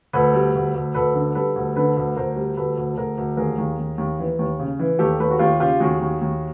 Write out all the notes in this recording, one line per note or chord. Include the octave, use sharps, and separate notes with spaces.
D2 A4 B4
G3
D2
D2
D2 A4 B4
D3
G3 A4 B4
D2
D3 A4 B4
D2
D2 A#4 C5
G3
D2 A4 B4
D2
A4
D2 G#4 A#4
D2
D#2 G#4 A#4
D#2
D#2
D#2
E3
D#2
C#3
E3
D#2 G4 A4
D#2 A4 B4
F#4
D#2 F4 G4
C#3 F4 G4
D#2 F#4 G#4
D#2
D#2